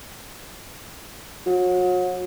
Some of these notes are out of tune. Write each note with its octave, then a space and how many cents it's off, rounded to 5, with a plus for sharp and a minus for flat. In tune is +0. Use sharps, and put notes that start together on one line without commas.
F#3 -35